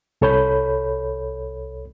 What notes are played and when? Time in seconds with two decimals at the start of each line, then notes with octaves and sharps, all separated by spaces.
0.21 C2 A4 C#5 B5 G6